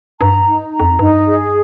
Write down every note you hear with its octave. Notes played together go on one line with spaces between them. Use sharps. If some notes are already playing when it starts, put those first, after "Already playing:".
G2 A#5
D#4
A#5
F2
G2 D#4
G#4